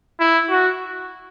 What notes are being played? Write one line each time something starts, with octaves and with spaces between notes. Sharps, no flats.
E4
F#4